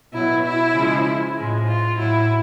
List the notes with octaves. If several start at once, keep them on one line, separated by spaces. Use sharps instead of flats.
B2 F#3 E4
E4
C#3 F3 G#3
A2 F3 G#3
F4
A2 F#3 E4